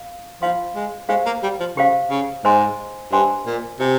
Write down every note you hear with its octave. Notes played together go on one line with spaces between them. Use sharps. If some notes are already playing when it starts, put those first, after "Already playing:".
Already playing: F5
F3 F4 C5 F5 C6
G#3
G#3 G4 C5 F5
A#3
G3
F3
C#3 G4 C5 F5
C#3
G#2 C5 D#5 G#5 C6
G2 C5 D#5 G#5 C6
A#2
C3 F4 C5 D#5 G#5